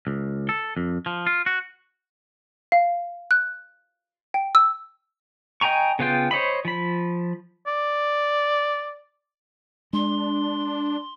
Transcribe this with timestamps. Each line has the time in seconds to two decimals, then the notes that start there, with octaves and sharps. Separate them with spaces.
0.07 C#2
0.49 A4
0.77 F2
1.06 F3
1.27 F4
1.46 F#4
2.72 F5
3.31 F#6
4.34 G5
4.55 E6
5.61 D#5 G5 G#5 A#5 C#6
5.99 C#3 B3 F4 G5
6.31 C5 C#5 D#5 B5
6.65 F3 B5
7.67 D5
9.93 G#3 D4 C6